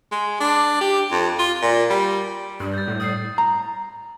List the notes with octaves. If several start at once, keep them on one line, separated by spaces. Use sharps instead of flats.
G#3
D4
G4
F2
F4
A#2
G3
G2 G3
G6 A6
A2
G3 D#6 C7
A#5